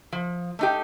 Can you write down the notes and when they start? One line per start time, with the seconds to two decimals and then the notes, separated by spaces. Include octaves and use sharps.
0.12 F3
0.59 A3 D#4 G4